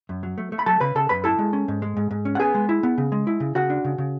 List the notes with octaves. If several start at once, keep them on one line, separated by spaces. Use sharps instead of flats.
F#2
F#3
A3
A3
B5
F#3 A4 A5
C#3 B4 B5
C#3 A4 A5
F#2 B4 B5
E4 A4 A5
G#3
C#4
G#2
G#3
G#2
G#2
C#4
F#5
B3 G#4 G#5
G#3
E4
B3
C#3
G#3
E4
C#3
C#3 F#4 F#5
D4
C#3
C#3